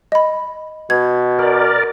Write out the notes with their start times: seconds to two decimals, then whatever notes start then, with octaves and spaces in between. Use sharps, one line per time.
0.12 D#5 B5
0.90 B2 G#6
1.39 A#4 D5